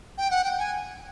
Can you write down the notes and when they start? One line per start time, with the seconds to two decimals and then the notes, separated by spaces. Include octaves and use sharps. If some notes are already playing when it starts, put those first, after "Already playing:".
0.18 G5
0.31 F#5
0.44 G5
0.59 G#5